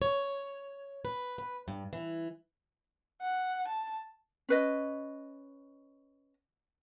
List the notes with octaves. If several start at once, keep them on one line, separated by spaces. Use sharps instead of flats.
C#5
B4
B4
G2
E3
F#5
A5
C#4 B4 D#5